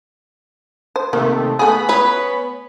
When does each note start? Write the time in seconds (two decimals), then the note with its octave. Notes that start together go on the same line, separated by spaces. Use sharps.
0.96 C5
1.13 C3 D#3 A3 A#3
1.59 A3 B3 G#4 B5
1.89 C#4 B4